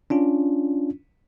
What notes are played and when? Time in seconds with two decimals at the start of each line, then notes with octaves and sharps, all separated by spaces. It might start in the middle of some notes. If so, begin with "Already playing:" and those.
0.10 C#4 D4 F4